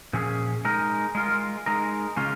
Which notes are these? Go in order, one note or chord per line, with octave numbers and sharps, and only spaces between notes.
A#2 F3 C#4 G#4
G#3 D#4 A#4
G#3 F4 A#4
G#3 D#4 A#4
C#3 G#3 C#4 F4